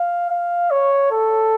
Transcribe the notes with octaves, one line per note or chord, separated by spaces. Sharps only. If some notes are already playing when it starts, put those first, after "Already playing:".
Already playing: F5
F5
C#5
A4